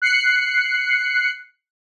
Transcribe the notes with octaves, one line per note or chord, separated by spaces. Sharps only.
F#6 C7 C#7